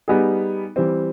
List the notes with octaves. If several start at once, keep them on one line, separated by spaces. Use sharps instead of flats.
G3 B3 D#4 G#4
E3 G3 C4